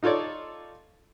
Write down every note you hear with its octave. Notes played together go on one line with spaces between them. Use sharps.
D#4 F4 A4 C#5 D5